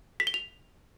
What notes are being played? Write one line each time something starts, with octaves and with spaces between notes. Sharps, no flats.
B6
G7
F7